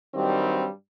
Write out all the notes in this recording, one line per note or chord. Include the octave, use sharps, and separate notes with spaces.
G2 D#3 F#3 G3 C4